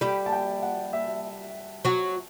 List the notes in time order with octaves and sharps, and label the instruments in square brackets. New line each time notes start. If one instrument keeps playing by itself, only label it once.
[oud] G3 G4 [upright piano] B5
[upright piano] A5
G5
F#5
E5
[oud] F#3 F#4